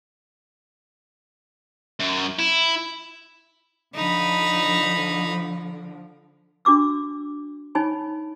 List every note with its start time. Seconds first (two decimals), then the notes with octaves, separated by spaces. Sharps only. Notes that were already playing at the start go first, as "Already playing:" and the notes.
2.00 F#2
2.39 E4
3.95 D3 F3 D#4 B5
6.65 D4 F#4 D6 E6
7.75 D#4 C#5 G#5 B5